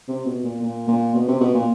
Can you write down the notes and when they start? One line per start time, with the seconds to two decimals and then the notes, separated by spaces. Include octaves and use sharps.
0.08 C3
0.26 B2
0.44 A#2
0.62 A#2
0.88 A#2
1.14 B2
1.28 C3
1.41 B2
1.54 A#2